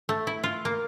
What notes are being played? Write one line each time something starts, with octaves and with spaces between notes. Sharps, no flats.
A3
E4
F4
A#3